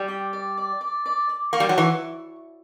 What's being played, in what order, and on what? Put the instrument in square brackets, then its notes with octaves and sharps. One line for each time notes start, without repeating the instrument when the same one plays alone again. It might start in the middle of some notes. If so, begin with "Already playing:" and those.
Already playing: [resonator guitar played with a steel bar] G3
[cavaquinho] G4
D5
D5
D5
D5
D5
[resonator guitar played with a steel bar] A#3 [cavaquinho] C#6
[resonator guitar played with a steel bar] G3
F#3
[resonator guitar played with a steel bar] E3 [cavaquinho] C#6